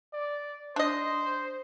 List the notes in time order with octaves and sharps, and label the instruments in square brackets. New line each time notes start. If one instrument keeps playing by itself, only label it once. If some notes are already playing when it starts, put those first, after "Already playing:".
[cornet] D5
[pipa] D4 D#5 [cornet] C5